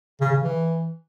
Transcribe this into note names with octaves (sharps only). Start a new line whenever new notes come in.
C#3
C#3
E3